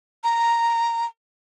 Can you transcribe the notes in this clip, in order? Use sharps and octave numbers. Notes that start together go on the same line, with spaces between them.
A#5